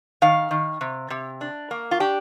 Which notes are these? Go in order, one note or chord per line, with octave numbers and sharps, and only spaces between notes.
D#3 F5
D#3
C3
C3
D4
A#3
F4
D4 G4